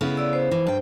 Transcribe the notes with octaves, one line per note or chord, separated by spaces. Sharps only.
C#3 B3 E4
D5 E6
C5
E3
G2 G5